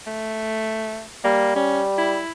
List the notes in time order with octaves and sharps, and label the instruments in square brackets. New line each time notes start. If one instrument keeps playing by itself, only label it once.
[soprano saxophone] A3
[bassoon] G3 [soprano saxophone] A#3
[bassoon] G3 [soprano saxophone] C#4
[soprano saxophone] E4